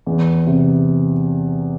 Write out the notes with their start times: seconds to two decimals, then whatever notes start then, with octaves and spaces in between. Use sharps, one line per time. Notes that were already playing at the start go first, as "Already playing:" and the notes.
0.06 E2
0.47 C3